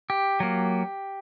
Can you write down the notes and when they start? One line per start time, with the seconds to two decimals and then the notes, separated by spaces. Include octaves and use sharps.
0.10 G4
0.40 F#3 A#3